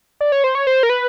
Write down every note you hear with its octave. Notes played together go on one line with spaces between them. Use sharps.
D5
C#5
C5
C#5
C5
A#4
B4